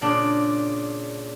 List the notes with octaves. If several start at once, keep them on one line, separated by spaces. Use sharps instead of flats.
A#2 C#3 D4